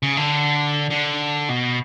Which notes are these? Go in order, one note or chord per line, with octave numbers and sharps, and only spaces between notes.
C#3
D3
D3
B2